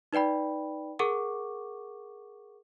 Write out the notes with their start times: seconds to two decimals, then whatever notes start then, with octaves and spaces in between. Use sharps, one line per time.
0.13 D#4 B4 D5 G5 B5
0.99 G#4 A#4 F#5 C#6 D6